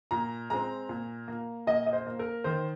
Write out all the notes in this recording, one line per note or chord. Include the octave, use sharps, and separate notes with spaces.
A#2 A#5
G#3 C4 A#5
A#2
A#3
A#2 D#5
D#5
C5
A#3
A#4
D#3 C5